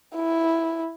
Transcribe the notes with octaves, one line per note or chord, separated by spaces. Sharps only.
E4